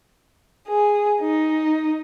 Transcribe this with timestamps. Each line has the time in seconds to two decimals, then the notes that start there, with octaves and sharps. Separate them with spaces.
0.68 G#4
1.21 D#4